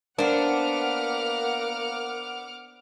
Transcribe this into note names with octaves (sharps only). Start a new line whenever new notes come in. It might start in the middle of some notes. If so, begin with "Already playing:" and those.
A#3 B3 D4 C5 F#5 D6 F6